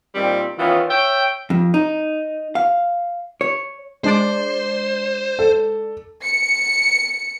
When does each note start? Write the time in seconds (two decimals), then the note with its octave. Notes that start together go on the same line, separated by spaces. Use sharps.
0.14 A#2 D#3 G3 C4
0.57 D#3 E3 B3 C#4 F4
0.89 C#5 E5 G5
1.50 F2
1.74 D#4
2.55 F5
3.41 C#5
4.04 G#3 D4 C5 D5
5.39 A4
6.22 C#7